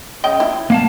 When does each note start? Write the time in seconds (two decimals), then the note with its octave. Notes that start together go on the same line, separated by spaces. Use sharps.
0.24 C#3 D#5 G5
0.40 E4
0.70 A#3 F5 A5